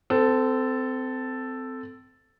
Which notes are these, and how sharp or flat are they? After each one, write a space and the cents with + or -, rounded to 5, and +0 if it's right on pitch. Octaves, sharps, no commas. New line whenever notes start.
C4 -25 A4 +0